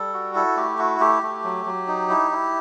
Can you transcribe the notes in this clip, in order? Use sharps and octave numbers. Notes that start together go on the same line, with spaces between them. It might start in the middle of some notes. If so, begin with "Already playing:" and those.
Already playing: G3 A4
F#4
E4 A4
A3 G4
E4 F#4
A3 G4
A3
F#3
F#3
D#4
E4
E4